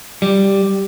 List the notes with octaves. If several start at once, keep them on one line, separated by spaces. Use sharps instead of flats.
G3